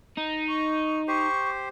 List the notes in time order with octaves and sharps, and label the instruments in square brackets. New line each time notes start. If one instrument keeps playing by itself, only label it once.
[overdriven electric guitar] D#4
[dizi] C#6
[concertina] G4 C5 [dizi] C#6